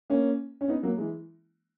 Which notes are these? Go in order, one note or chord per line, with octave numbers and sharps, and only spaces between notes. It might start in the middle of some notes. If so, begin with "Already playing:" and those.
A#3 C#4
C#4
B3 D#4
F#3 A#3
E3 G#3